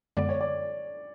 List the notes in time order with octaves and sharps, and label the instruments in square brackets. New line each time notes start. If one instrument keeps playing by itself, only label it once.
[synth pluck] F#2 D3 G#3 B3 [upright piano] D5
[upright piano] C#5
D5